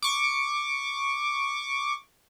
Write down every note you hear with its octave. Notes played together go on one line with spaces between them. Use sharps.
C#6 D6